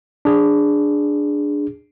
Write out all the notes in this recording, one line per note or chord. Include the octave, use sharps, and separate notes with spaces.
D4 G#4